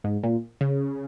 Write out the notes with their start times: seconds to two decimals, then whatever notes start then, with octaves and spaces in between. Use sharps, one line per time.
0.04 G#2
0.23 A#2
0.61 C#3